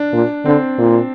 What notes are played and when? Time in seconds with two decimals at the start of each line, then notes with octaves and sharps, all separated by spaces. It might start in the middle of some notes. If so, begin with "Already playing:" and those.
Already playing: D4
0.13 A#2
0.45 D3 C4
0.78 A#2